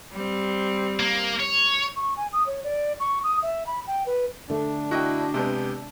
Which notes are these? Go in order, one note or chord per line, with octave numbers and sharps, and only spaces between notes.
G3 C4
A#3
C#5
C#6
G#5
D#6
C#5
D5
C#6
D#6
E5
B5
G5
B4
D3 A3 D4
E4 F#4 D#5 G5
C3 G#3 B3 G4